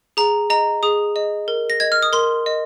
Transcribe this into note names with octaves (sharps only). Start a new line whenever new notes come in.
G#4 A#5
D#5 A#5
G#4 D#6
D#5
A#4
A#6
D#5 G#6
F6
D#6
A#4 C6
D#5